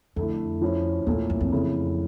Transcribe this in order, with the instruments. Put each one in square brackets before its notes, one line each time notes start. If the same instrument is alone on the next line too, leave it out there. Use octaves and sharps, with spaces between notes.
[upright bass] F2 [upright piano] D3 A3 E4
[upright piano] F3 C#4 E4
[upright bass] E2 [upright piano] A#2 A3 C#4 E4
[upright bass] F2
F2
[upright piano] C#3 E3 A3 E4